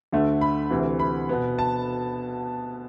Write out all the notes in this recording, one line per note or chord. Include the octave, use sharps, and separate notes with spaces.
D2 D3 A3
B5
D2 C3 E3
B5
B2 B3
A5